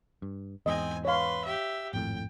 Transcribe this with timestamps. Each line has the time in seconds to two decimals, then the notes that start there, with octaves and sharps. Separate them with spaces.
0.22 G2
0.66 E2 G#2 C4 D#5 G#5
1.05 B4 C#5 F5 C6
1.45 G4 E5
1.93 G#1 F2 A2 G5